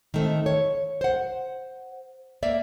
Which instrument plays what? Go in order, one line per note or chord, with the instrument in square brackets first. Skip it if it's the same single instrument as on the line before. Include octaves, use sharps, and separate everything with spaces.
[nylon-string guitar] D#3 A3 C4
C#5
C5 F#5
A#3 D5 E5